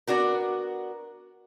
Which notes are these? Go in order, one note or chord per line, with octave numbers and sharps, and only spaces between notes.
B3 D4 F#4 A#4